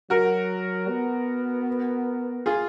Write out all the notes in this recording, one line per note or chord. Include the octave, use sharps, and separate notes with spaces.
F#3 F#4 A#4
B3
F4 G#4